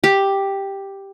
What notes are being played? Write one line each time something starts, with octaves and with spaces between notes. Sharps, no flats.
G4